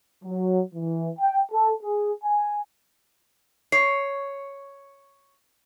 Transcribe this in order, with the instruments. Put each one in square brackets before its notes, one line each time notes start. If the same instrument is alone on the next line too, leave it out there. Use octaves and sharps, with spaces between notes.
[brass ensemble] F#3
E3
G5
A4
G#4
G#5
[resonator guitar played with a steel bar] C#5 [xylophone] C7